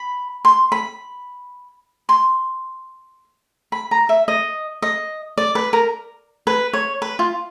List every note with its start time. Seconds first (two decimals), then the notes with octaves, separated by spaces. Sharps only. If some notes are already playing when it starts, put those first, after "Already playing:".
Already playing: B5
0.45 C6
0.72 B5
2.09 C6
3.72 B5
3.91 A#5
4.09 E5
4.28 D#5
4.82 D#5
5.38 D5
5.55 B4
5.73 A#4
6.47 B4
6.73 C#5
7.02 B4
7.19 F4